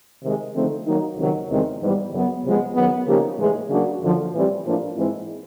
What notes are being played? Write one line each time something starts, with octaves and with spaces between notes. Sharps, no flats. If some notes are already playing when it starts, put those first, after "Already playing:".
C3 D#3 G#3
D3 F3 A3 C4 D#4
D#3 F#3 A#3 D#4
C#2 C3 D#3 F#3
E2 C3 D#3 G#3 C4
G#2 E3 G3 B3
F#2 C#3 F#3 B3
C#2 C3 F3 G#3 B3
F#2 D#3 F#3 B3
C#3 F3 A#3 D#4 G4
A2 E3 G#3
C#3 F#3 A#3 D4 F#4
F#2 D3 F3
A2 E3 G3 C4
A2 F3 A#3 D4 F4
G#2 E3 G#3 C4 E4